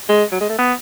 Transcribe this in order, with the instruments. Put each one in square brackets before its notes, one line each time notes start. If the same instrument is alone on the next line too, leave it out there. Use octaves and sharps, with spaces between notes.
[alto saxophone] G#3
F#3
G#3
A3
B3